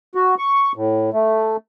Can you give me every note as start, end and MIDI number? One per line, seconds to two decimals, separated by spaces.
0.15 0.35 66
0.38 0.72 85
0.76 1.10 45
1.13 1.57 57